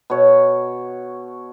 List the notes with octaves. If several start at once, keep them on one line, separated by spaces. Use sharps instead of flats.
B2 C#5